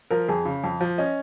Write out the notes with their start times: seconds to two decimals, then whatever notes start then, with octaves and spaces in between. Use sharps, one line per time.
0.11 F3 A#4
0.28 F2 G#4
0.45 C#3
0.64 F2
0.81 F3
0.98 C#4 D#5